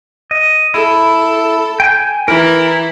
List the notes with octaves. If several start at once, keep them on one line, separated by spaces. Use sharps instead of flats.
D#5
E4 A4
G5 G#5 G6
E3 E4 A#4 A#5